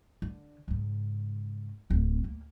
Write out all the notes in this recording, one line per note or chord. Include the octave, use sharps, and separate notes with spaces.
D3
G#2 C#3
D1 C4
A#3